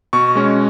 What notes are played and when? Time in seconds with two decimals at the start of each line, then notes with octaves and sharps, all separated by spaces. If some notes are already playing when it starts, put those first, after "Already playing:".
0.13 B2 C#6
0.35 G#3 C#4